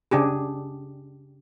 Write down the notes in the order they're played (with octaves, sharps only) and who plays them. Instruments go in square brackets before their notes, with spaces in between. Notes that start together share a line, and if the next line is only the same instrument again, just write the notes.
[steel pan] C#3 D4 G4 G#4